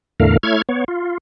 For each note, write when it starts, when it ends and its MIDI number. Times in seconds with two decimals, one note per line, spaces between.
0.20 0.37 40
0.20 0.37 45
0.20 0.37 50
0.20 0.37 57
0.20 0.37 70
0.20 0.37 77
0.43 0.62 57
0.43 0.62 64
0.43 0.62 73
0.43 0.62 89
0.43 0.62 92
0.69 0.84 59
0.69 0.84 73
0.88 1.18 65